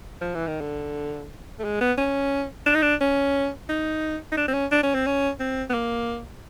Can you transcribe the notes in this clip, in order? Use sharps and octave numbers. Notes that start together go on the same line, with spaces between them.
F3
E3
D#3
D3
A3
G#3
B3
C#4
D4
D#4
D4
C#4
D#4
D#4
D4
C4
C#4
D4
C#4
C4
C#4
C4
B3
A#3